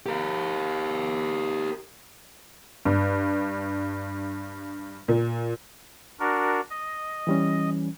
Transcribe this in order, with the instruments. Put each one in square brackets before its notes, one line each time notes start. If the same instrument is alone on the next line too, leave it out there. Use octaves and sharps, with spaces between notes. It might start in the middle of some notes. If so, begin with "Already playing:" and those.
[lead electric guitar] G4 A#4
[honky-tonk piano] G2
A#2
[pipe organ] D4 F#4 A#4
D#5
[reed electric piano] E3 G3 C#4